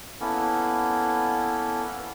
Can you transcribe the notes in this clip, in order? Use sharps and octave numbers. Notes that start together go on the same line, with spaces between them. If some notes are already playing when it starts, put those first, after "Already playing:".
A#3 B3 C#4 E4 A4